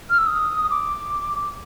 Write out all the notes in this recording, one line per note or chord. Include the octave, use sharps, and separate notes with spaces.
F6
E6
D#6
D6